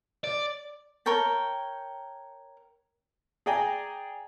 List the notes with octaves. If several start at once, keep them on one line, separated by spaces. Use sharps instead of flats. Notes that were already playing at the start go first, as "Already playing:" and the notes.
D5
A#4 C#5 G5 A5
G#4 D5 G5 G#5 A#5